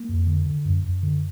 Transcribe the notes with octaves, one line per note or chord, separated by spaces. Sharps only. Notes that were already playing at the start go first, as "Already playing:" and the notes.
Already playing: A#3
F2
D3
D3
F#2
F#2
D3